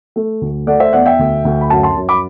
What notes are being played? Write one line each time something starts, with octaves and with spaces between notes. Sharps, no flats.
A3
D2
A3 D5 F#5
C5 E5
E2 D5 F#5
E5 G5
D2
D2
B5
F#2 F#5 A5
A5 C6
F#2
B5 D6